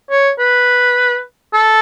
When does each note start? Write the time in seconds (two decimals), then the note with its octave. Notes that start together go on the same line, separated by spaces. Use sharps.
0.10 C#5
0.39 B4
1.54 A4